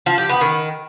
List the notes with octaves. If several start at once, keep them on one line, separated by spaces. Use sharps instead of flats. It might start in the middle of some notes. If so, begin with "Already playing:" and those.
F3
G4
B3
D#3